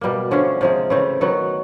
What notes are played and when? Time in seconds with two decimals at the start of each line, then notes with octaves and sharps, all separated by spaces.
0.01 B2 G3 A#3
0.31 D3 F3 A3 C#4
0.61 C3 F3 G#3
0.90 C#3 E3 A3 C4
1.21 D#3 F#3 B3